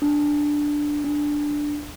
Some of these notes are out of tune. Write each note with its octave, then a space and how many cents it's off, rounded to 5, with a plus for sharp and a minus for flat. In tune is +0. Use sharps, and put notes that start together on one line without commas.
D4 +5
D4 +5